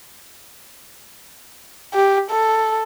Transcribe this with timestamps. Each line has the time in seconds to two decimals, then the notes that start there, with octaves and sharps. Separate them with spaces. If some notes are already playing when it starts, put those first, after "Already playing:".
1.94 G4
2.31 A4